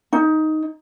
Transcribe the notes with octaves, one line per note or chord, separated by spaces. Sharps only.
D#4